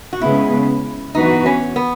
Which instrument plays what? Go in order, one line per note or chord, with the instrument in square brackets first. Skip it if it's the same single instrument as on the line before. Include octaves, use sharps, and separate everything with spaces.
[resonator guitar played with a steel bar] F#4
[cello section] C#3 G#3 B3 [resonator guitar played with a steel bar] E4
[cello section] E3 B3 F#4 B4 [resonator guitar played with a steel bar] D#4
[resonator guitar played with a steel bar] C#4
B3